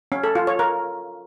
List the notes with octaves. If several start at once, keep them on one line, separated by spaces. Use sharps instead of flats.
C#4
A4
F4
C#5
A#4